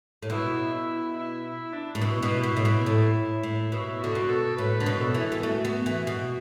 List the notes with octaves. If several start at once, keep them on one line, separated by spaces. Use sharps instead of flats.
A2
B2 E4
E4
E4
E4
D4
A2
B2 E4
B2
B2
A2
B2
A2
A2
B2 E4
D3 F#4
B2
A4
A2 B4
D3
B2
A4
E3
B3
A3 F#4
B3
E3 F#4
B2